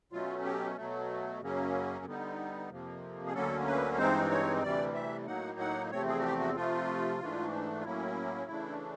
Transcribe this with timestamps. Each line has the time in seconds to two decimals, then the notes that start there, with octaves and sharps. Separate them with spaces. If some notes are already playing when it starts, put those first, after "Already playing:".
0.12 B2 F#3 A3 C#4 F4
0.45 G4
0.77 B2 F#3 A3
1.41 F#2 C#3 F#3 A#3 C#4
2.05 D3 G3 B3 D#4
2.70 F2 C3 F3 A#3
3.26 G#4
3.34 D2 D3 F#3 A#3 C#4 A4
3.67 B4
3.98 G2 E3 G#3 C4 D#4 C5
4.30 C#5
4.62 D2 C3 E3 G3 D5
4.94 E5
5.26 A2 F#3 A#3 D#4 F#5
5.60 F#5
5.91 E2 C3 F3 A3 C4 C#5
6.08 G#4
6.19 F#4
6.23 G4
6.39 F#4
6.55 C3 F3 A3 F4
7.20 G#2 E3 A3 D4
7.80 F4
7.84 A2 F#3 A#3 C#4 E4
8.48 C#3 E3 A3 D4